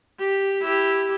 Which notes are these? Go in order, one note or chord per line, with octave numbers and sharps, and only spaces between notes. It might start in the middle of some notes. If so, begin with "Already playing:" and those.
G4
E4 G4